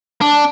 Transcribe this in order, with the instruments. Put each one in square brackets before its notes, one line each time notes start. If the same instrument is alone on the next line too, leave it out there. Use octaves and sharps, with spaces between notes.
[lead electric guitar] D4